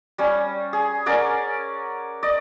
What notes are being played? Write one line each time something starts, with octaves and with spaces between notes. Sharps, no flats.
G3 C#4
G#4
C#4 A#4 D5 F#5
D5 D#5